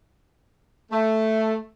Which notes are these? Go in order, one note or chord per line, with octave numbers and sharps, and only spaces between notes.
A3